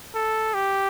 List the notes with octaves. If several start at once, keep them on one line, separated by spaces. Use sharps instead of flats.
A4
G4